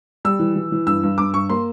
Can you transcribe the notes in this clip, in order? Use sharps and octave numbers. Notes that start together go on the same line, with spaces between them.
G3 E6
E3
E3
E3
G2 E6
G2
G2 D6
G2 C#6
A#3 C6